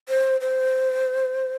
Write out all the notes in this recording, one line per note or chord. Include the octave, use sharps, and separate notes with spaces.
C5
C5